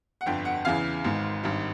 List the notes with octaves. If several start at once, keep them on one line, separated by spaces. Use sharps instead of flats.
F#5
G1 F2 D3 G5
F#5
E2 C#3 E3 F5
G#1 G#2 D#3
G#1 G2 D#3